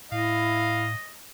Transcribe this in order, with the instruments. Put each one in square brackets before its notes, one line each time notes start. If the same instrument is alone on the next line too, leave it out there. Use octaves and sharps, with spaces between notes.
[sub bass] A2 [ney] E4 [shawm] D#5 [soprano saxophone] F5